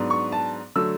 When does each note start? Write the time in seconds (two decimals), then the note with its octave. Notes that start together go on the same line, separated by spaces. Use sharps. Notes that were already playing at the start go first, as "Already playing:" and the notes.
Already playing: G#2 F#3 B3 D4
0.10 C#6
0.32 A5
0.76 D3 F#3 A3 E6